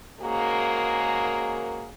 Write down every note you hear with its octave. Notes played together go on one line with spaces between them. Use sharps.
G#2 C#3 A#3 F#4 G#4 A#4